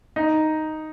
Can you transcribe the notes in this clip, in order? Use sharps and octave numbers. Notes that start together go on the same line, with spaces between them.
D#4